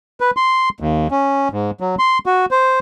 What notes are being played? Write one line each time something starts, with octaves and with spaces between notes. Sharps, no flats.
B4
C6
D#2
C#4
G#2
F#3
C6
F#4
C5